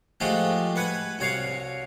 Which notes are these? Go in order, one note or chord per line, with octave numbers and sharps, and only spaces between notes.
F3 G#3 A3 F#4 G4
B4 F#5 G#5 B5
C2 F#4 C#5 F5 C#6